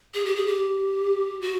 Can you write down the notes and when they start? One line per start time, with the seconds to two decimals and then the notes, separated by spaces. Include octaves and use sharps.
0.14 G#4
0.25 G4
0.36 G#4
0.46 G4
1.41 F#4